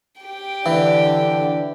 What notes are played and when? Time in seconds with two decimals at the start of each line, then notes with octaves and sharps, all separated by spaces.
0.22 G4 G5
0.66 D3 E3 D4